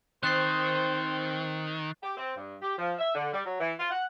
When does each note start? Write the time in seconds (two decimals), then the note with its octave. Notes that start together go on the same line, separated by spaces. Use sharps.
0.23 D#3 C4 C5 F#6 A6 C7
2.03 G4
2.17 C4
2.36 G2
2.62 G4
2.79 F3
2.99 E5
3.15 D3
3.33 G3
3.45 F#3
3.61 E3
3.79 F4
3.91 F#5